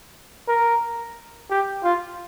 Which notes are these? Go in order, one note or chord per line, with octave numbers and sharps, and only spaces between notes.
A#4
G4
F4